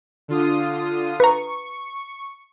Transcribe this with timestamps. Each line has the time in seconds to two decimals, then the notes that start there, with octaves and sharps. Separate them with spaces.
0.28 D3 F4 D#6
1.20 B4 A#5 C#6